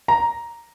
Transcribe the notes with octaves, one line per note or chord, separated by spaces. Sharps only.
A#5